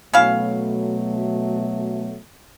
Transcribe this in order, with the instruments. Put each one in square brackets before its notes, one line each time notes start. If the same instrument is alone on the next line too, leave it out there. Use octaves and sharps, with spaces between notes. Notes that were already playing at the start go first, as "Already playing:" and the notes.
[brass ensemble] B2 F#3 A3 [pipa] C#4 E4 F5